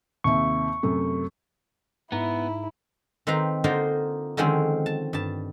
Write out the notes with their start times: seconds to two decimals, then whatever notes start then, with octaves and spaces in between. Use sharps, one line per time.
0.24 D#2 C3 E5 C#6
0.83 F#2 C3 A3
2.12 G#2 B3 E4 A#5
3.27 D#3 C4 B4 F5 A#5
3.64 D3 A#3 D#4 F4 A#4 C5
4.37 D3 D#3 F3 G#3 C4 C#4
4.86 A5
5.13 G2 A5